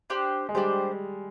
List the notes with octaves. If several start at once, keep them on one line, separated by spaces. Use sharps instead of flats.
D4 G4 C5
G#3
G3 D4 G4 C5